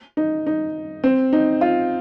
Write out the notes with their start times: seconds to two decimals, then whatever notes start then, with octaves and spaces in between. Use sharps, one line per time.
0.17 D#4
0.47 D#4
1.04 C4
1.33 D#4
1.61 F4